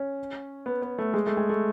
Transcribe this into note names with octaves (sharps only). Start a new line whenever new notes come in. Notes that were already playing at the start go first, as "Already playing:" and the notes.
Already playing: C#4
B3
B3
A3
G#3
A3
G#3
A3